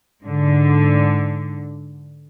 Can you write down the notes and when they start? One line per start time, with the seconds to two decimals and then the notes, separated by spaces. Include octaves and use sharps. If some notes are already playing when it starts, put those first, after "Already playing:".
0.24 G#2 D3